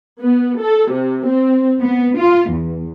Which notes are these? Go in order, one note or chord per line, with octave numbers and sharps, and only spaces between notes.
B3
A4
C3
C4
B3
F4
E2